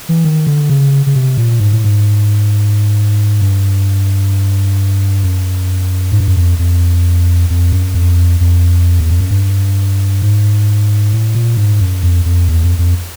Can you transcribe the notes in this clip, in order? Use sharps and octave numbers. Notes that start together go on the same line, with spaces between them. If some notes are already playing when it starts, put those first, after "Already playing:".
E3
D#3
D3
C#3
C#3
C3
A#2
G#2
A2
G#2
G2
F#2
G#2
G2
F#2
F2
F2
F2
F#2
F2
F2
E2
F2
F#2
G2
G#2
A2
A#2
G#2
F#2
F2
F2
E2
F2
F2